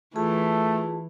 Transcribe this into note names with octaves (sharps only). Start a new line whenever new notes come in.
E3 A3 F4 G#4 A5